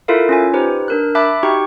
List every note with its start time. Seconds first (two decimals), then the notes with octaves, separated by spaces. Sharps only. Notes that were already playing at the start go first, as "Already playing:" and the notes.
0.08 E4 F4 A4 A#4 E5 F5
0.29 C#4 F4 G#5
0.53 D#4 G4 B4 C5
0.88 D4 A#4 F#6
1.15 E5 A5 B5 D6 F#6
1.43 D#4 F#4 G4 G5 C#6